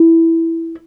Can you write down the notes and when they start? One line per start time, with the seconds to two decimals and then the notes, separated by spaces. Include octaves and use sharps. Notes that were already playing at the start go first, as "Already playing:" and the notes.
Already playing: E4